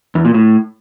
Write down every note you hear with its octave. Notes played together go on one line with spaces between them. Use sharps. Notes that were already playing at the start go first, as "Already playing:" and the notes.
E2
A#2
A2